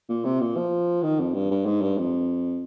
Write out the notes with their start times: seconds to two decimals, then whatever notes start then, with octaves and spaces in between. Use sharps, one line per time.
0.09 A#2
0.25 C3
0.41 A#2
0.57 F3
1.03 D#3
1.20 F2
1.34 G2
1.51 G2
1.66 G#2
1.82 G2
1.98 F2